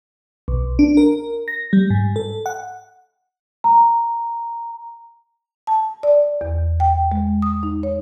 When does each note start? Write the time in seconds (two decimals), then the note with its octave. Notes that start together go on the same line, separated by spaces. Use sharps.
0.48 B1
0.79 D4
0.97 A#4
1.48 A#6
1.73 G3
1.90 G#2
2.16 A4
2.46 F#5
3.64 A#5
5.67 A5
6.03 D5
6.41 E2
6.80 G5
7.12 G#3
7.42 D#6
7.63 D#4
7.83 C#5